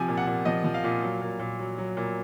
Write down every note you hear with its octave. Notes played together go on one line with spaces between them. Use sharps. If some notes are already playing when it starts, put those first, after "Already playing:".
Already playing: C3 F3 G#5
A#2
F#5
A#2
F3 D#5
F3
F5
A#2
F#3
A#2
A#2
F#3
F#3
A#2